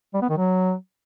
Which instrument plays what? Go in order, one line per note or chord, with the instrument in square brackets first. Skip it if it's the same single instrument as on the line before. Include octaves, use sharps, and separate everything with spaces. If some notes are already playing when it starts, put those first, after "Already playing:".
[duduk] G3
B3
D#3
F#3